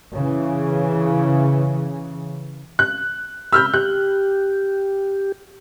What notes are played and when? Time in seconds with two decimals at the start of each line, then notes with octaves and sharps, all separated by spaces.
0.15 C#3 E3
2.79 F#6
3.53 B5 E6 F6 G6
3.74 G4 F#6